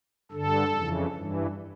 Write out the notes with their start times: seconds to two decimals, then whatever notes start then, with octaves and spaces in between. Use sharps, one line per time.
0.31 G2 D3 A4
0.73 F2 C#3 E3
1.13 G2 E3